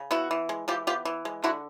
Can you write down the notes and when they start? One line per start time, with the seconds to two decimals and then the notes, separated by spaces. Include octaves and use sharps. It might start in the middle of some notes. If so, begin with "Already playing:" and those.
Already playing: C#3
0.11 B3 E4 F#4
0.31 E3
0.49 G#3
0.68 E3 F4 G4
0.87 B3 F4 G4
1.05 E3
1.25 G#3
1.44 D3 E4 F#4